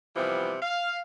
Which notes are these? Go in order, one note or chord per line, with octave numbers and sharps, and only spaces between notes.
C3 E3 F3 G3 B3
F5